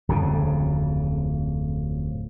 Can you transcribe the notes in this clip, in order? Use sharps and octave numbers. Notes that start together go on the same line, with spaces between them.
D1 F2 C#3